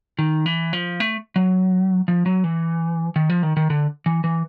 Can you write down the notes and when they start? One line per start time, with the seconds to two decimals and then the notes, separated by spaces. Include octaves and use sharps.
0.19 D#3
0.46 E3
0.73 F3
1.00 A3
1.36 F#3
2.08 F3
2.26 F#3
2.44 E3
3.16 D#3
3.30 F3
3.43 D#3
3.57 D#3
3.70 D3
4.06 E3
4.24 E3